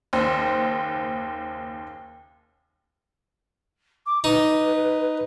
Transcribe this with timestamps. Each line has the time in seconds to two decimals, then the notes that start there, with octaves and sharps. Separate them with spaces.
0.13 F#1 D#2 C5
4.06 D6
4.24 D#4 B4